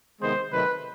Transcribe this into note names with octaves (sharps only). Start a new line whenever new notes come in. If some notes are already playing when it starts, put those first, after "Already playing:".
C3 D#3 G#3 B3 C5
C3 D#3 F#3 A3 B4